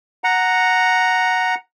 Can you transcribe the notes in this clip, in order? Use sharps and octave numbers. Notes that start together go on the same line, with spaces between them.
F#5 A#5